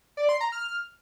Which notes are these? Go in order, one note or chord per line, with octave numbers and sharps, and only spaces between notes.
D5
C6
A#5
F6